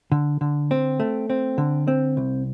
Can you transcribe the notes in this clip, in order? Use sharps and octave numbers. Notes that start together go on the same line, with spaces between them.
D3
D3
C4
A3
C4
D3
C4
C2